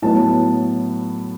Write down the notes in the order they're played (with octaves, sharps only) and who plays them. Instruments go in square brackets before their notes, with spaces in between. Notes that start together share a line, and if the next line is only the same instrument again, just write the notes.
[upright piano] A2 F#3 B3 A5